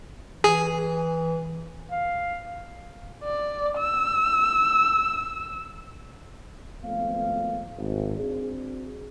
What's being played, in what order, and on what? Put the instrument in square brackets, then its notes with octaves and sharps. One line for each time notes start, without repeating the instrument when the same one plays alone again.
[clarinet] E3 [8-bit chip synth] G#4
[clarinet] F5
[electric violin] D5
E6
[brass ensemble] G#1 F2 A3 B3 F5
G#1
C4 D4 F#4 G#4